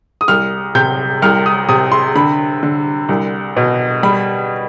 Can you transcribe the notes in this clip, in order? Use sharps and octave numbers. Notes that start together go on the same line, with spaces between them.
D#6
C2 F6
C3 G6
C2 F6
D#6
C3 D#6
C6
D3 B5
D3
C2
B2
G3 B5